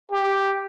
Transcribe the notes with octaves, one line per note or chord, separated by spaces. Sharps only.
G4